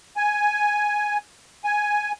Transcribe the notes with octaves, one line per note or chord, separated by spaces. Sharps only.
G#5
G#5